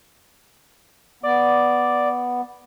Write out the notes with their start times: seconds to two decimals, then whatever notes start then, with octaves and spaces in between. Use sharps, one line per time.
1.23 B3 D5